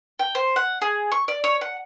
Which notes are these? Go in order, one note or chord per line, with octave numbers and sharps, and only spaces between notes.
G5
C5
F#5
G#4
C#6
D5
C#5
F#5